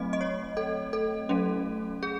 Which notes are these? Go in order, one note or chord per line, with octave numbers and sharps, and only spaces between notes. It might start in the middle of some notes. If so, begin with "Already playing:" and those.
Already playing: F#3 A3 C4 D#5
D#5
C#5
A4
A4
F#3 A3 C#4
G#4